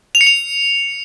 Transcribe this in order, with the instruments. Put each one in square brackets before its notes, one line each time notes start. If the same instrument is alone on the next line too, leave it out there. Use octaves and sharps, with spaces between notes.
[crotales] F7
C#7
F7